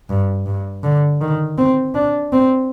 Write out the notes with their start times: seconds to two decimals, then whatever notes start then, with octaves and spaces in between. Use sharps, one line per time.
0.09 G2
0.46 G2
0.84 D3
1.21 D#3
1.58 C4
1.95 D4
2.33 C4